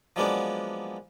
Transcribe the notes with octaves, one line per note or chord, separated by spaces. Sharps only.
F3 F#3 G#3 A#3 B3 D4